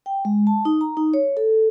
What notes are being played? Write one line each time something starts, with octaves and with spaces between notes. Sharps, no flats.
G5
G#3
A5
D#4
A#5
D#4
C#5
A4